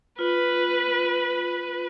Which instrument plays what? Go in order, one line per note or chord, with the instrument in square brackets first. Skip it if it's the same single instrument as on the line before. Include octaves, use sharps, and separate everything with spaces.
[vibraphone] F4 [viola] B4